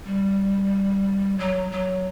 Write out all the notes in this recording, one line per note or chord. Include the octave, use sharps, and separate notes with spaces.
G3
F#3
F#3